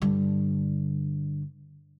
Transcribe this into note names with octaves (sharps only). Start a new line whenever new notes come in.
G2 D3